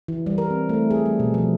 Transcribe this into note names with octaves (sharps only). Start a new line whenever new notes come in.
E3
G3
A#4
C4
A3
G#4
G3
B2
F3